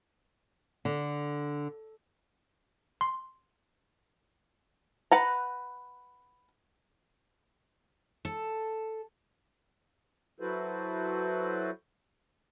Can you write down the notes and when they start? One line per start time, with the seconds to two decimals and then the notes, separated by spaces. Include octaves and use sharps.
0.85 D3
3.01 C6
5.11 B4 F#5 A#5
8.25 A4
10.40 F#3 E4 F#4 A4 B4 C5